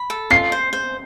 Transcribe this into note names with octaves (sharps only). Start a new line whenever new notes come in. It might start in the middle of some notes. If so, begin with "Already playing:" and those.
Already playing: B5
A4
F4 C7
C5
C5